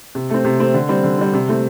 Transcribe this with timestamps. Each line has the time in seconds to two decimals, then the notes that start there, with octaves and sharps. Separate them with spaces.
0.15 C3
0.30 A3 C4
0.45 C3
0.60 A3 C4
0.74 D3
0.89 G3 C4
1.04 D3
1.18 G3 C4
1.33 C3
1.48 A3 C4